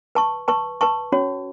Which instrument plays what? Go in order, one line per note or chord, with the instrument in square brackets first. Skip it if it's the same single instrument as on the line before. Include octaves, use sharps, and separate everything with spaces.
[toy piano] B4 A5 C#6
B4 A5 C#6
B4 A5 C#6
C#4 F#4 C#5